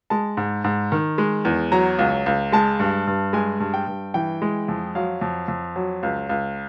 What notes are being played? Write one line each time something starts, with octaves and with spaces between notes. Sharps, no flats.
G#3 A5
G#2
G#2
D#3
G#3
E2
F#3 A#5
C#2
C#2
G#3 A5
G2
G2
G#3 G#5
G2
G5
G2
E3 G5
G#3
F2
F#3 F5
F2
F2
F#3
C#2
C#2